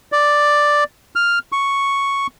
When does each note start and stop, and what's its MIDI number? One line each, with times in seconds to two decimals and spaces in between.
0.12 0.84 74
1.16 1.39 89
1.52 2.27 85